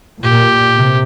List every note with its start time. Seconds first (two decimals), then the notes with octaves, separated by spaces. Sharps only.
0.22 A#2 G4
0.75 C3